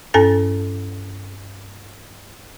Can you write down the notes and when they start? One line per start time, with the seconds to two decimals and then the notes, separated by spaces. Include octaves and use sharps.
0.14 G2 C#4 A4 A5 A6